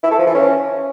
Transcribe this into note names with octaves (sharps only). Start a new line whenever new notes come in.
E4
A4
F3
E3
C#4